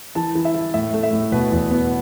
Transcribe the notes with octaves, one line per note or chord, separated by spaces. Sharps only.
E3 A5
E3
E5
E4
A2 E5
A3
E5
A2
B2 B4
E2
B3